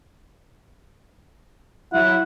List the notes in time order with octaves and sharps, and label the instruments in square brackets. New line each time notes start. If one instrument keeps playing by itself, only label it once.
[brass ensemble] F#3 E4 [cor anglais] F#5